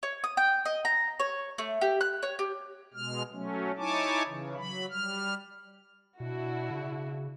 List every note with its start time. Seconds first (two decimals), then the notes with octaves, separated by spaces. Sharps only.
0.03 C#5
0.24 D#6
0.37 G5
0.65 D#5
0.85 A#5
1.20 C#5
1.58 A3
1.81 G4
2.01 F#6
2.23 C#5
2.39 G4
2.94 B2 G#3 F6
3.32 F#3 A3 C#4
3.78 D#4 E4 C#5 G#5 A5 D6
4.27 C#3 E3
4.57 F#3 B5
4.90 G3 F6
6.20 B2 D4 E4 F#4
6.71 C#3